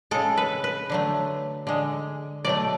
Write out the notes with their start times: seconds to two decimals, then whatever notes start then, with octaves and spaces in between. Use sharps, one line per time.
0.11 C#3 G#3 A4
0.37 B4
0.64 B4
0.90 D3 F#3 A3
1.67 D3 G#3
2.45 B2 F#3 A3 D5